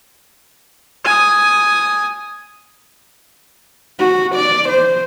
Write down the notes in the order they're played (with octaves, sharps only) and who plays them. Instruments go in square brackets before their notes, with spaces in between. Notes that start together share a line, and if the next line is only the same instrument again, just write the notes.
[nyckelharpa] G#5 D#6
[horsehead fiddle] F#4
D5
C5